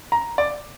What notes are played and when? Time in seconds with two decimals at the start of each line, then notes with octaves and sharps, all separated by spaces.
0.12 A#5
0.38 D5